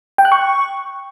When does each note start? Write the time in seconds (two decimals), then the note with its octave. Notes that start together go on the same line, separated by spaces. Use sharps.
0.18 G5
0.25 F#6
0.32 C#6